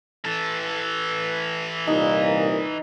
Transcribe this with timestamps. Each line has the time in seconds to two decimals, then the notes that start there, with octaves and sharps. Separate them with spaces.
0.25 E3 A4
1.87 C2 A#2 D#4